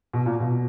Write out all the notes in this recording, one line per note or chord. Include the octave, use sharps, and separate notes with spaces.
B2
A#2
B2